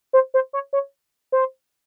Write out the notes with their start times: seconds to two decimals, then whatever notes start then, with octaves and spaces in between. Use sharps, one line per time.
0.13 C5
0.34 C5
0.53 C#5
0.73 C#5
1.32 C5